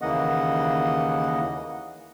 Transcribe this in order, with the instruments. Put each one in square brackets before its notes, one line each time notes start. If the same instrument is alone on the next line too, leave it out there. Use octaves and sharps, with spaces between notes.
[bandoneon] D#2 C#3 E3 A#3 D#5 F#5